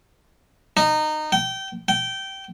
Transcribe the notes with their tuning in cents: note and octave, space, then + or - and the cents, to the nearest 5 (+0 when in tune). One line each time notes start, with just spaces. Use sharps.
D#4 -20
G5 -20
G5 -15